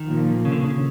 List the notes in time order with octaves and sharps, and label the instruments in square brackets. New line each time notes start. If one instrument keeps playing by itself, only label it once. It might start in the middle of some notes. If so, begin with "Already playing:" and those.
Already playing: [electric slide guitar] D#3
[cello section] A#2 F3 A#3
[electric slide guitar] C#3
D3
C#3